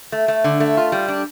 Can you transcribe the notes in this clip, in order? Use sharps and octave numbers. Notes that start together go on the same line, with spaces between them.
A3
A3
D3
A3
F4
G3
D4